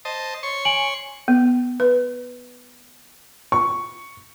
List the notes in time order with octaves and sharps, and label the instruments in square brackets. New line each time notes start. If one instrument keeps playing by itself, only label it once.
[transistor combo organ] C5 D#5 A5
C#5 C6 C#6
[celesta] G#5 D7 F#7
[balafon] B3
B4
[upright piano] C#6